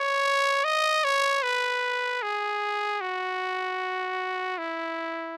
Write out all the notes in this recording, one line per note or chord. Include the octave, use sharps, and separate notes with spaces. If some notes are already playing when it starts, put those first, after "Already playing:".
Already playing: C#5
D#5
C#5
B4
G#4
F#4
E4